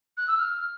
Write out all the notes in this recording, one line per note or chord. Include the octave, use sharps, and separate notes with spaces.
F#6
E6
F6